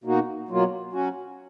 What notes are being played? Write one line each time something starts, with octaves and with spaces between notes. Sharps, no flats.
B2 A#3 D#4 F#4
B2 F#3 A#3 F4
F#3 C#4 F#4